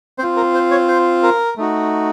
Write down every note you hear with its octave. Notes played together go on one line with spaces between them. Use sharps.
C4 F4 C5
A#4
C5
C#5
C5
A#4
A3 D#4 F#4